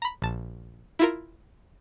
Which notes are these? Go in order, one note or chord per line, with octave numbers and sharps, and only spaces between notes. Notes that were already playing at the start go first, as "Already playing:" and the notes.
A#5 B5
A#1 A5
E4 F4 A#4